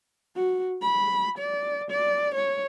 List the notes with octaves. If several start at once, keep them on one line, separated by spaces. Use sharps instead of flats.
F#4
B5
D5
D5
C#5